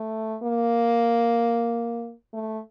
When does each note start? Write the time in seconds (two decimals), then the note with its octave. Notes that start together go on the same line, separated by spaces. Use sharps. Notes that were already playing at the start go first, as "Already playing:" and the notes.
Already playing: A3
0.43 A#3
2.33 A3